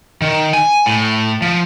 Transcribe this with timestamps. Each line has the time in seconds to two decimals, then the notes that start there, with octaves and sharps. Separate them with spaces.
0.22 D#3
0.53 G#5
0.86 A2
1.42 F3